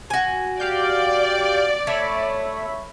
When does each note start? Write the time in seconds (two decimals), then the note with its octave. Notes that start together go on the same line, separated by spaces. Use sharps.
0.10 F#4 G#5
0.60 G4 D5 F5 G6
1.87 A3 C#5 E5 B5